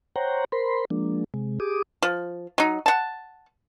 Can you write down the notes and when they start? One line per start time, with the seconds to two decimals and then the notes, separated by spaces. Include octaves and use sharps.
0.16 C5 C#5 F#5 G5 A#5
0.52 A#4 C5 B5 C6
0.90 F3 G#3 A#3 D4
1.34 C3 G#3
1.60 G4 G#4 D6 D#6
2.02 F3
2.58 F#3 D#4
2.86 F#5 A5